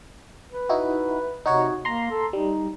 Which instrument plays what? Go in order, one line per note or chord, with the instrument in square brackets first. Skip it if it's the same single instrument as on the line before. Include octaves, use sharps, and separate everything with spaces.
[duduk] B4
[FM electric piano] D#4 E4 F#4
[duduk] C3 [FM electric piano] D#4 F#4 C#5
[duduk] A#3 [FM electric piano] A#5 C6
[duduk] A4
[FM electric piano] G3 [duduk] D#4